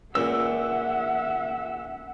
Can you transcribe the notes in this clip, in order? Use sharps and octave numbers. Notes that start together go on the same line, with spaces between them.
C#2 A#2 E5 F#5 E6